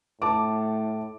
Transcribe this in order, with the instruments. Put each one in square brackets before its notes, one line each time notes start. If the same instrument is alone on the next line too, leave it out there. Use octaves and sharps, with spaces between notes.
[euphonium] A2 [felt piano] A5 D6